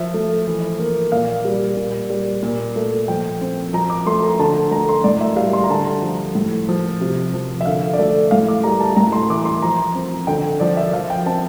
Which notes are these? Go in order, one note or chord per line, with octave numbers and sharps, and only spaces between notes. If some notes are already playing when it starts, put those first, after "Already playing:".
Already playing: F3 E5
A3
E3
A#3
A#2 F5
G3
A#2
G3
A#2
A3
F3 G5
C4
F3 A#5
D6
A3 C6
A#5
D3 A5
A3 A#5
C6
A2 D5
E5
G3 F5
C6
A#5
D3 A5
F3
A2
F3
C3
F3
E5
D3 F5
D5
A3 E5
A2 F5
D6
G3 A#5
A5
A2 A#5
C6
C6
E3 D6
C6
F3 A#5
C4
D3 G5
F3 D5
E5
F3 F5
G5
C4 A5